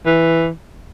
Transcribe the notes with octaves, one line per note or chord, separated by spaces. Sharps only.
E3